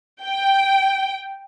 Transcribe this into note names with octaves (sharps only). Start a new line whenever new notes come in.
G5